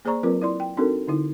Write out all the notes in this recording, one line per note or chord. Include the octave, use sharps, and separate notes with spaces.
A#3 G#4 C5 D5 A#5 C#6
F#3 C4 F4 A#4 B4
E4 D5 C6
G5
C4 D4 D#4 F#4 A4 A#4
D3 D#4 E4